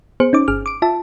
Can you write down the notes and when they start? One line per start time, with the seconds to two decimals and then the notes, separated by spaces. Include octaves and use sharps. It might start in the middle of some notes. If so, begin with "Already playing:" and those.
0.20 B3 G#4 C5 C#7
0.33 C#4 D#4 D6
0.48 G1 G#4 F6
0.66 D6 D7
0.82 F4 E5 A5